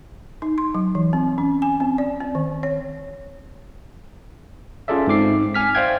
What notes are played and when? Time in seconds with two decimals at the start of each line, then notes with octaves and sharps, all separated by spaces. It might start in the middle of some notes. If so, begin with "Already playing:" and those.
0.42 D#4
0.58 C6
0.75 F#3
0.95 E3
1.13 C4
1.38 C#4
1.62 G#5
1.80 C4
1.98 D5
2.20 C4
2.35 D#3
2.63 C#5
4.88 C#4 F4 G#4 A4 D5 E5
5.07 G#2 C4 D6 C7
5.54 G#5 F6 B6
5.75 C5 D5 E5 F5 G5 G#6